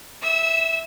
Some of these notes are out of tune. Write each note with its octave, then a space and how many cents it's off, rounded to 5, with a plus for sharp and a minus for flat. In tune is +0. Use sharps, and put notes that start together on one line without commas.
E5 -5 E6 -25